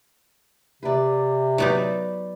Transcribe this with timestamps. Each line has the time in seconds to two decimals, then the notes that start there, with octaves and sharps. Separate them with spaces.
0.83 C3 B4 D5
1.58 F#3 B3 D#4 B4 D5